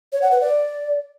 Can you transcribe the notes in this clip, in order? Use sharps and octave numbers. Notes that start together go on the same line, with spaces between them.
C#5
F#5
B4
D5